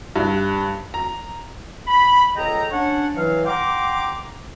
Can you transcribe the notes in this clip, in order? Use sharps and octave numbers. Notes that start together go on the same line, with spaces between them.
G2
A#5
B5
C#2 G#4 A4 D#5 G5 A#5
C#4 D4 C#5 F#5
E3 F#3 F5
F#5 G5 A#5 C6 D6